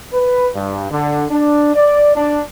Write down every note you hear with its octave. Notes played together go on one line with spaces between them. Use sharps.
B4
G2
D3
D4
D5
D4